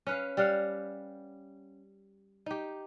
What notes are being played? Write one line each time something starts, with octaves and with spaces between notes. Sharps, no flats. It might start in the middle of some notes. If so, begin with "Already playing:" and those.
C#4 B4 F5
G3 G4 F5 F#5
D#4 G4